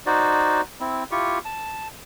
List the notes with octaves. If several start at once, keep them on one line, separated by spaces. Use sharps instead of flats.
D#4 F#4 C5 D5
C4 E4
E4 F4 G4 C#6
A5